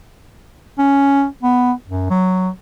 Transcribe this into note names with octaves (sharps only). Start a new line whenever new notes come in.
C#4
B3
F#2
F#3